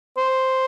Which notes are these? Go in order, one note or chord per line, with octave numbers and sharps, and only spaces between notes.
C5